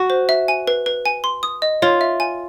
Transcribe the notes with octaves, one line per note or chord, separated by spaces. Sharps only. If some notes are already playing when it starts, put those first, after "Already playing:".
Already playing: F#4
C5
E5
G#5
B4
B4
G#5
C6
D#6
D#5
F4 C#5
E5
G#5